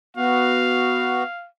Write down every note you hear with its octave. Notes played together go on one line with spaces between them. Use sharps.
B3 F#4 F5